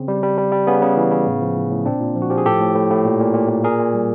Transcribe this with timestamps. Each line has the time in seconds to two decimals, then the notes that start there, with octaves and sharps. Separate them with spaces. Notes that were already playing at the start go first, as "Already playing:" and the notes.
Already playing: C#3 C4
0.08 G3
0.23 G3
0.38 G3
0.52 G3
0.67 C#3 B3 C#4
0.82 C#3
0.97 E3
1.11 C#3
1.26 A2
1.42 F3
1.57 A2
1.71 A2
1.86 A#2 C4 D4
2.01 A#2
2.16 F3
2.22 F#4
2.30 F3 G4
2.38 G#4
2.46 A2 G4 A4
2.60 A2
2.75 A2
2.90 A2
3.05 A#2
3.20 A#2
3.35 A#2
3.49 A#2
3.64 A#2 G#4 A#4
3.79 A#2
3.94 G3